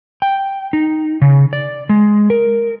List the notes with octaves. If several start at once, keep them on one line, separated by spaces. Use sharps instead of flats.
G5
D#4
C#3
D5
G#3
A#4